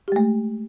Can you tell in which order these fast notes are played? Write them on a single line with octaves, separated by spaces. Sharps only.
G4 G#3 A3